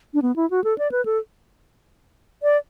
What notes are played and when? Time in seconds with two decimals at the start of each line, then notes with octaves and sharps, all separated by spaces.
0.14 D4
0.22 B3
0.36 E4
0.50 F#4
0.64 A4
0.78 D5
0.92 B4
1.05 A4
2.43 D5